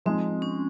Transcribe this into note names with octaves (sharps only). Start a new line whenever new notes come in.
F3 G#3 C4 D#4
C#4